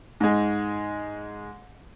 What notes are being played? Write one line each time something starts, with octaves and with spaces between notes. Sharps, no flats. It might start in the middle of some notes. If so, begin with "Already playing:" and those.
G#2 G#3